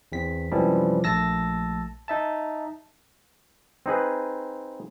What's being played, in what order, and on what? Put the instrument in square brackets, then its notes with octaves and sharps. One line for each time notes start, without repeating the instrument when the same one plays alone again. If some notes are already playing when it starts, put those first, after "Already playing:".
[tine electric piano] E2 C4 B6
F#2 C3 E3 F3 G3 G#3
A#1 A3 A5 E6 A6 A#6
D#4 E5 A5
[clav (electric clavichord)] C4 D#4 G#4 B4